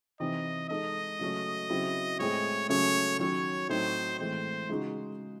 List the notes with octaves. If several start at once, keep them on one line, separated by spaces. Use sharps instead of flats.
C3 E3 C4 D#4 D#5
G#3 D#4 A4 D#5
C#3 F#3 A3 C#4
C#3 F#3 C4 E4
A2 G#3 C4 E4 G#4 C#5
C#3 F#3 A3 C#4 G#4 C#5
D#3 F#3 C#4 C#5
A2 F#3 A3 C4 D#4 C5
A2 E3 G#3 C4 C5
C#3 G#3 D#4 F#4